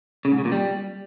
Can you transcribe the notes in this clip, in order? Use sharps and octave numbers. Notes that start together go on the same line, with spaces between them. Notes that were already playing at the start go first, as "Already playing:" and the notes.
C#3
G#2
C#3
A#2
G3